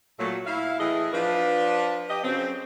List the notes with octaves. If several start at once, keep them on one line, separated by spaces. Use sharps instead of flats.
A#2 F#3 A3
E4 F5
A2 E3 A3 E4 G#4 D#5
F3 D4 B4
G4 D#5
C#3 F#3 C4